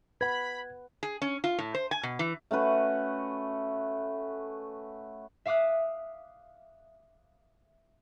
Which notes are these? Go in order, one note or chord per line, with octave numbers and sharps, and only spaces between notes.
B4 F#5 B5 G#6
G#4
C#4
F4
A2
C5
G#5
B2
E3
A3 C#4 F#4 B4
E5 F5 D6 D#6 F#6